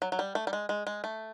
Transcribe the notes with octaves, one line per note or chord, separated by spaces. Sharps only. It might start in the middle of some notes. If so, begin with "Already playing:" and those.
F#3
F#3
G3
A3
G3
G#3
G#3
G#3
A3